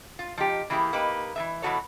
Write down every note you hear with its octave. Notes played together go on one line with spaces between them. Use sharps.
F4
F3 D#4 G4
E3 A#3 E4 G4 G#4
A#3 D#4 G4 B4
E3 G#3 E5
B2 E3 G3 F#4 A4 C#5